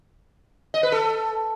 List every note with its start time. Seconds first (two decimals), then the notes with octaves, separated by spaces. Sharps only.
0.74 D#5
0.83 B4
0.92 A4